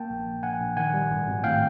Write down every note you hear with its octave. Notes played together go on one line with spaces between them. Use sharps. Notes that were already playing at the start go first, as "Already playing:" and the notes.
Already playing: A#3 G5 A5
A#1
A#1
A#1 F#5 G#5
A#1
D#3 F#5 G#5
G3
G#1
G#1
A2 F5 G5